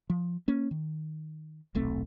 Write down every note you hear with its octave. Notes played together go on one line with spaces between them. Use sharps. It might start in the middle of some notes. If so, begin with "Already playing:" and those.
F3
A#3 C#4
D#3
D#1 B1 A3 C4